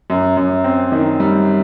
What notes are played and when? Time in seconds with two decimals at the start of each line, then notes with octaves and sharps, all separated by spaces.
0.10 F#2
0.37 F#2
0.64 C4
0.92 D#3
1.20 G3